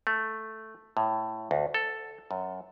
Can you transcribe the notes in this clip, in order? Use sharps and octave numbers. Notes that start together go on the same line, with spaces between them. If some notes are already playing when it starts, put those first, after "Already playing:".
A3
A2
D2
A4
F#2